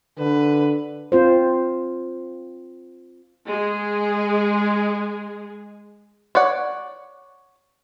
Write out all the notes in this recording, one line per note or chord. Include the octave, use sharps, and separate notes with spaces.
D3 B4
C4 F4 C5
G#3 G#4
C#5 D5 F#5